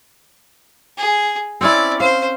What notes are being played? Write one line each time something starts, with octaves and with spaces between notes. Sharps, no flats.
G#4
C4 C#4 E4 D5
C5 F5